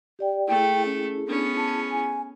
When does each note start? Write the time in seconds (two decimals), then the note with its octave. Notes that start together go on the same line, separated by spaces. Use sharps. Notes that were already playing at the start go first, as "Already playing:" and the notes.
0.19 G4 D5 G5
0.48 A3 E4 G#4 A4 G5
0.86 C#4
1.27 B3 C#4 D4
1.57 A5
1.91 G#5